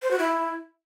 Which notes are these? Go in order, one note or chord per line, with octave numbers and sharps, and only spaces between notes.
C5
F#4
E4